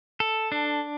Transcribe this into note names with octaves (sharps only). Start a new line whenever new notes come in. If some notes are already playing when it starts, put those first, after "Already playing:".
A4
D4